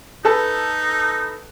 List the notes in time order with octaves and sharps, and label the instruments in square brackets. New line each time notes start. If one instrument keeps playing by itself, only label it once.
[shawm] D#4 [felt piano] A4 B4 A5